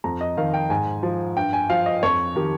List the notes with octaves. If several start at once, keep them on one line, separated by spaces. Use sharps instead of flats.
F2 A#5
D#5
D#3 F5
G5
G#2 G#5
F3
G2 G5
G#5
F3 F5
D#5
F2 C#5
D#3 G4